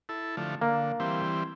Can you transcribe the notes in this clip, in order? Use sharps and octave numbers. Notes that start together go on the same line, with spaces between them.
E4 A4
D3 F3 A3
D3 A#3
E3 G3 C4